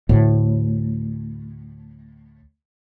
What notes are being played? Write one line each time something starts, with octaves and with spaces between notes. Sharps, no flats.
D2 A2